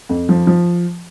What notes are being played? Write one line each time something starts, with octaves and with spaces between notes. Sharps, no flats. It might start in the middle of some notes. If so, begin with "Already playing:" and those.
F2
F3
F3